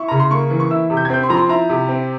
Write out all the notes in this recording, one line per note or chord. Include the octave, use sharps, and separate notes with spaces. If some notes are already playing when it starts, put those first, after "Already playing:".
Already playing: E4 C#6
C#3 A#5
C6
A#3 C#6
E3
C#6
E4 E6
C3
G6
G#6
C4 G6
C6
F3 A#5
C6
E4 A#5
C3
C4